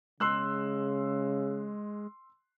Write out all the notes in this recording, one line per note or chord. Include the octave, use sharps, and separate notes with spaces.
C#3 G#3 C6 E6 F#6